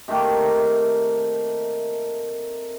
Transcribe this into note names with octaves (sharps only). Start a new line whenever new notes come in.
C3 D#3 A3 A#3